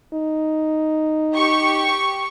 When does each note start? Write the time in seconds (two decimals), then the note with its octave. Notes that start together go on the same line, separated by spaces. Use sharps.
0.13 D#4
1.34 G4 C#6